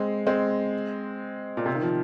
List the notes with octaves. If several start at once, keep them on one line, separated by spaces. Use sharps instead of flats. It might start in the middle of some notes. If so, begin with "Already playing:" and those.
Already playing: G#3 C4
G#3 C4
A#2
C3
D#3
F3